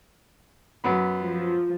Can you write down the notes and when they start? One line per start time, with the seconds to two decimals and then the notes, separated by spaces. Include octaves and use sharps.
0.84 F#2 B3 B5
1.23 F3